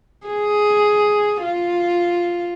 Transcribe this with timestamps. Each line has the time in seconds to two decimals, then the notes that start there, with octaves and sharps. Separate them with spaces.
0.27 G#4
1.42 F4